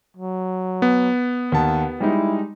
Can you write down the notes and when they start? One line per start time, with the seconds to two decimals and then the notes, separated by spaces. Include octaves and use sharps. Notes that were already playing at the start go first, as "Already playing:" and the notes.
0.17 F#3
0.82 B3
1.52 D#2 F#5 A5
2.00 G3 G#3 D#4 E4